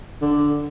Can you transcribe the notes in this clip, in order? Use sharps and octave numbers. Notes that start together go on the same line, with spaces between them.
D3